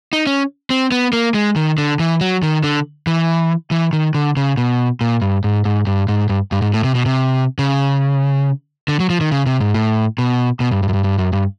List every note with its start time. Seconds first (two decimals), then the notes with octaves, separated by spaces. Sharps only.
0.13 D#4
0.27 C#4
0.70 C4
0.92 B3
1.13 A#3
1.34 G#3
1.56 D#3
1.78 D3
1.99 E3
2.21 F#3
2.43 D#3
2.63 D3
3.07 E3
3.71 E3
3.93 D#3
4.15 D3
4.37 C#3
4.57 B2
5.01 A#2
5.22 G2
5.44 G#2
5.65 G#2
5.87 G2
6.09 G#2
6.29 G2
6.52 G2
6.62 G#2
6.74 A2
6.84 C3
6.95 B2
7.06 C3
7.59 C#3
8.88 D3
9.00 F#3
9.10 F3
9.21 D#3
9.32 C#3
9.46 C3
9.61 G#2
9.74 A2
10.18 B2
10.60 B2
10.72 G2
10.83 G2
10.89 F#2
10.94 G2
11.04 G2
11.18 F#2
11.33 G2